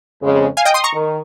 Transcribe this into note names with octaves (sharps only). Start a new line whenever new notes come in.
F2 C#3 G#3
F5 G#5
D#5 G5
C6 D#6
A#5 C#6
D#3